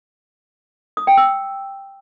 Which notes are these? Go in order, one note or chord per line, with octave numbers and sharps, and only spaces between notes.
D#6
G5
E6